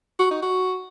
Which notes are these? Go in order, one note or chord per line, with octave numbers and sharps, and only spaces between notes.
F#4
D#4
F#4